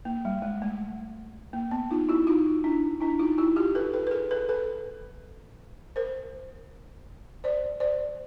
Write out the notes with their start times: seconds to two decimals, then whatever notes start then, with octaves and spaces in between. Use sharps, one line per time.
0.05 A#3
0.25 G3
0.42 G#3
0.62 A3
1.53 A#3
1.71 B3
1.91 D#4 F4
2.09 E4 F#4
2.27 D#4 F4
2.64 D4 E4
3.01 D4 E4
3.19 D#4 F4
3.38 E4 F#4
3.56 F4 G4
3.75 A4 B4
3.93 A4 B4
4.07 B4
4.11 G#4 A#4
4.31 A4 B4
4.49 A4 B4
5.96 A#4 C5
7.44 C5 D5
7.80 C5 D5